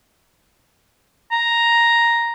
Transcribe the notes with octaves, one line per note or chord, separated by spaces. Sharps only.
A#5